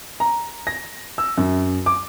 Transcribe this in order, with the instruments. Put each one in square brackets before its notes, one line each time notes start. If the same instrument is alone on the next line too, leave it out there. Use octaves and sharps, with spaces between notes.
[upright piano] A#5
A#6
E6
F#2
D6